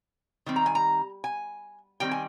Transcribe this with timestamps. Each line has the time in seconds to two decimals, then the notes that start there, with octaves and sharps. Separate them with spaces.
0.46 D#3 G3 C4
0.56 A#5
0.66 G#5
0.75 A#5
1.24 G#5
2.00 D#3 G3 C4 G5
2.11 G#5